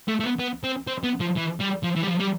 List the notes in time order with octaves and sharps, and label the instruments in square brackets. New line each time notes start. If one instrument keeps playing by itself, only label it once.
[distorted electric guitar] A3
A3
B3
B3
C4
C4
B3
F3
E3
G3
F3
E3
G3
F3
G3